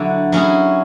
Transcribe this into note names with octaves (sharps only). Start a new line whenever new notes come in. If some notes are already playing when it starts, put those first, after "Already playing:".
Already playing: D3 F#3 E4
F#3 C#4 E4 G#4